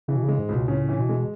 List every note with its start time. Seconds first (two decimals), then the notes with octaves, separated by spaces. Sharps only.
0.08 C#3 E3
0.16 B2
0.23 C#3
0.29 G#3
0.38 G#2
0.49 C#2
0.54 B2
0.68 A2 C#3
0.89 E3
0.99 B2
1.09 G#3